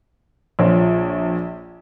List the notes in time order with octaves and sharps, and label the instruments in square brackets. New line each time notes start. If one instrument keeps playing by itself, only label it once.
[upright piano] A#1 F4 C5 C#5 C6